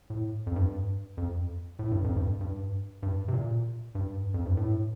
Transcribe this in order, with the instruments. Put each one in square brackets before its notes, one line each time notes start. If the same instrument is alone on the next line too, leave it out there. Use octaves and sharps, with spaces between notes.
[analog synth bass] A2
F2
G2
F2
A2
G2
F2
G2
G2
G2
C3
A#2
G2
F2
G2
A2